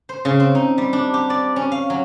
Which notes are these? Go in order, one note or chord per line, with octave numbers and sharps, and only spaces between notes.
C5
C#3
C4
D#4
G3
D4
G4
D5
C#4
F5
F#3